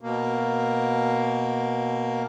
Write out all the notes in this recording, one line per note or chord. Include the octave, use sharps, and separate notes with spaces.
B2 A#3